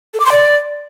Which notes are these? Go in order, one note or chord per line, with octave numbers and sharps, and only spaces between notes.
A4
D6
C6
D5